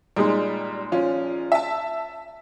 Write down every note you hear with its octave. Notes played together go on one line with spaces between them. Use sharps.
A#2 G3 G#3 D#4
F3 C#4 F4
E5 A5